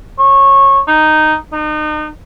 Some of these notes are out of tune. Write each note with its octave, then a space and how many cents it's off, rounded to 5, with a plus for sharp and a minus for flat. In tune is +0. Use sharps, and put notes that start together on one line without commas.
C#5 -20
D#4 -5
D#4 -35